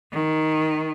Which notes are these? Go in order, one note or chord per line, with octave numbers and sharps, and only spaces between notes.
D#3